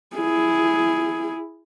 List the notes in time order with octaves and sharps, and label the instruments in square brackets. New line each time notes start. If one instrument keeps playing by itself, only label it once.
[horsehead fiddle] E4 G#4